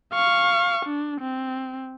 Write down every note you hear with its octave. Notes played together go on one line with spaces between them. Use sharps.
F5 C#6
D4
C4